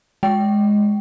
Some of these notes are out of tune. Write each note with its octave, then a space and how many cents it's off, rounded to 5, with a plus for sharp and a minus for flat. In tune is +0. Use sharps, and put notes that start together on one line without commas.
G#3 +0 G5 -20